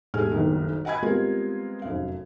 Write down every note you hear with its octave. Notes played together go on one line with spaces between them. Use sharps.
E1 G3 A3 G#4 G#5 F6
F#1 B1 G2 D#3
D#5 F#5 G#5 B5 G#6
G3 G#3 B3 C4 F4 A#4
F1 F#2 F5